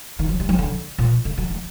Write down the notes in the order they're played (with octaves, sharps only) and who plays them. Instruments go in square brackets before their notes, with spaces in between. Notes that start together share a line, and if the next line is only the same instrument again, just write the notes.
[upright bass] D#3
F#3
G3
F#3
D3
A#2
D3
F#3
A3